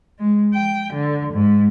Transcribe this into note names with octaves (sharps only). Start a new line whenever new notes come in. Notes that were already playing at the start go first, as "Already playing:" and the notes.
G#3
G5
D3
G#2